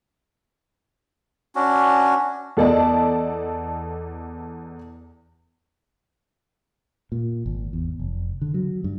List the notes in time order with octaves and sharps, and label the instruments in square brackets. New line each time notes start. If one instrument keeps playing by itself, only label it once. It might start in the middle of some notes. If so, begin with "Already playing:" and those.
[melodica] C#4 D4 F#4
[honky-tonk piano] E2 A4 D5 D#5 A5
[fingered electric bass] A#2
G#1
E2
F1
D3
F#3
G2